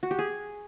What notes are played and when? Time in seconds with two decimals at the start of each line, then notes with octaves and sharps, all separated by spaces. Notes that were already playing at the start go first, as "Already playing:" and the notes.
0.03 F#4
0.11 G4
0.19 G#4